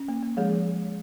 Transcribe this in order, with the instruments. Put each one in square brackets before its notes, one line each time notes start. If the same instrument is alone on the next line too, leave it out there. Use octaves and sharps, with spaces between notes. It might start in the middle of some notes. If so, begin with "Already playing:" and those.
Already playing: [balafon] C#4
A#3
A#3
F3 G#3 G#4
F3